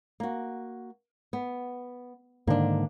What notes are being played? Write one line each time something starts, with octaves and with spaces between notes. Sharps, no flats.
A#3 F#4
B3
G#2 D3 D#3 A#3 D4